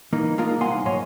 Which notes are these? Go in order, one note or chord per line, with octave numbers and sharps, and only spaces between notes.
E3 A#3 D#4
G#3 A#3 D4 D#4 F4 A#4
C2 A#3 F5 F#5 G#5 C6
G#2 F#3 C#5 D#5 C6